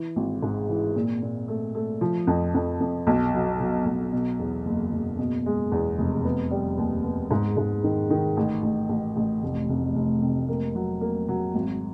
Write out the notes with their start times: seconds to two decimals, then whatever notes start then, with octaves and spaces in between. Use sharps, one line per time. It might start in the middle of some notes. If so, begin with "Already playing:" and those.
Already playing: E3
0.16 G#1
0.43 G#2
0.69 E3
0.96 A#2
1.22 A#2
1.48 A3
1.75 A3
2.01 F3
2.27 F2
2.54 F2
2.80 F2
3.07 B1
3.34 F#3
3.60 F#3
3.86 B1
4.12 B2
4.39 E2
4.66 F#1
4.93 F#1
5.18 B2
5.46 G#3
5.72 E2
5.98 F1
6.25 B3
6.51 G3
6.78 D#2
7.04 B3
7.31 G#2
7.57 G#2
7.84 D#3
8.10 D#3
8.37 A1
8.63 A1
8.89 A1
9.17 A1
9.43 F1
9.69 F1
9.95 F1
10.22 C3
10.48 A#3
10.75 F#3
11.01 A#3
11.28 F#3
11.55 G#1